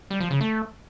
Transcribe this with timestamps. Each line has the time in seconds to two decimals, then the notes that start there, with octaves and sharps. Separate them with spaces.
0.10 G3
0.21 F3
0.31 C#3
0.41 A3